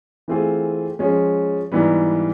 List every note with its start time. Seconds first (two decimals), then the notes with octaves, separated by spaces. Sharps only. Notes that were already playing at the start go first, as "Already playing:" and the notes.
0.28 E3 A3 C4 F4 G#4
0.99 F3 G#3 C#4
1.72 G#2 E3 G3 B3